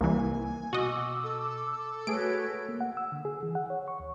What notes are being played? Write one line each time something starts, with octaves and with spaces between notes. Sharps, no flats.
C2 E3 A#3 G#5
B2 F#4 D#5 C#6 D6 E6
A4
A3 F#4 G#4 B4 C#5 D7
A#3
F#5
E6
D3
G#4
E3
F#5
C#5
C#6
D#2